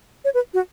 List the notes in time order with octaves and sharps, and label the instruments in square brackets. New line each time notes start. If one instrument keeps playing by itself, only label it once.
[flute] C#5
B4
F#4